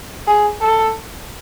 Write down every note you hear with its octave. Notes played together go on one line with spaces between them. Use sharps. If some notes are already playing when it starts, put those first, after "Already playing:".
G#4
A4